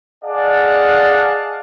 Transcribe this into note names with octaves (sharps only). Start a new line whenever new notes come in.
G#4 D5 D#5 F5 F#5 A5